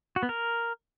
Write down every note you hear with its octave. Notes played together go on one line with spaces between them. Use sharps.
F#4
B3
A#4